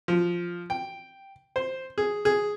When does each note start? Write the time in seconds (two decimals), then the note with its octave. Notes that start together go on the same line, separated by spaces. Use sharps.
0.08 F3
0.70 G5
1.56 C5
1.98 G#4
2.25 G#4